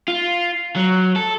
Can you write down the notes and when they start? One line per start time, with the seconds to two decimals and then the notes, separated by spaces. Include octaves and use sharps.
0.08 F4
0.76 F#3
1.16 A4